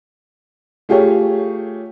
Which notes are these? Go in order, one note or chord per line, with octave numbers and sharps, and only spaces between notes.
A3 F4 G4 G#4 C#5